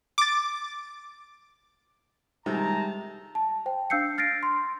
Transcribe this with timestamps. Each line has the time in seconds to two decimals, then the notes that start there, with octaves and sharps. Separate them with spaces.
0.18 D6 A6
2.46 C3 D#3 G3 G#3 A5 A#5
3.35 A5
3.66 C5 G5
3.90 D4 F5 E6 G6 C7 C#7
4.18 F6 A6 A#6 C7 D7
4.43 C6